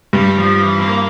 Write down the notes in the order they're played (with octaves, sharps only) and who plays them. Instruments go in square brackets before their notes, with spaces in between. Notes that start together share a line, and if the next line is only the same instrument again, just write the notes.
[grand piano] G2 [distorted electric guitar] G3
[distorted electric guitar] F3
E3
C4
A#3